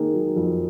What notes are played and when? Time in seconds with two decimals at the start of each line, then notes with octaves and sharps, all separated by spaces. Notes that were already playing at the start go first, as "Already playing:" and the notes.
Already playing: D#3 A#3 G#4
0.14 F#3
0.36 F2